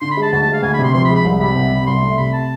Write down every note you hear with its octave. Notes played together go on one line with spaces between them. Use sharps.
D3 C6
B5
G#3
A5
D2 A5
G#3 A5
F5
D2 G#5
B5
C3 C6
F3 C6
B5
G#3
B5
C2
C3 B5
C2
C3
C2 C6
A3
C3 B5
A5